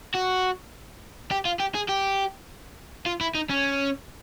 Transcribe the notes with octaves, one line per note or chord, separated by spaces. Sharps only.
F#4
G4
F4
G4
G#4
G4
F4
E4
D#4
C#4